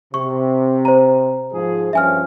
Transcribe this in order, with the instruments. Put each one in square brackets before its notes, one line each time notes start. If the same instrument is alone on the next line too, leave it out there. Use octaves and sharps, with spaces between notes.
[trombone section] C3 [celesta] C#6
[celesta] C5 A#5
[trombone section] G#2 F3 G#4
[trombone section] G2 F3 C#4 [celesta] E5 G#5 F6